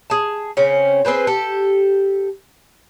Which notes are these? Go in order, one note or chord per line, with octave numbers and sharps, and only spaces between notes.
G#4 A5
C#3 C4 C#4
C4 G#4 B4 C5
G4 A4